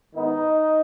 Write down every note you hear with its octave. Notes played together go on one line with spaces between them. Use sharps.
G#2 D#3 B3 D#4